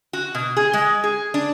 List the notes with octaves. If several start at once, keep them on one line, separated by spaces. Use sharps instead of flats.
F#4
B2
G#4
G#3
G#4
D4